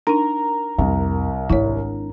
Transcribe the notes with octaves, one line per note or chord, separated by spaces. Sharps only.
D4 D#4 A#4
C2 F2
G#1 D4 E4 C#5